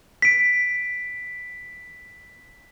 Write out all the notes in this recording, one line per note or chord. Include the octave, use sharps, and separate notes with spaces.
B6 D7